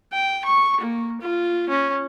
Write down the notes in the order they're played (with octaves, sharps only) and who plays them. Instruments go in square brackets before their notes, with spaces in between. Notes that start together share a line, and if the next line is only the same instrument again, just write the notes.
[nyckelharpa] G5
C#6
A#3
F4
C#4